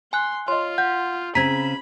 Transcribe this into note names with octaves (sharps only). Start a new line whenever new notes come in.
G#5 C6 F#6
F4 C#5 D#5 C6
F#5 G6
C#3 C4 A#5 B5 G#6 B6